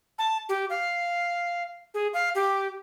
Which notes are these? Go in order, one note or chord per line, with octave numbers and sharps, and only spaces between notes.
A5
G4
F5
G#4
F5
G4